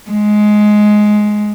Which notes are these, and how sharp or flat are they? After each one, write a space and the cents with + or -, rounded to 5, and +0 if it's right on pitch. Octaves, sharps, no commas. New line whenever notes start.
G#3 +15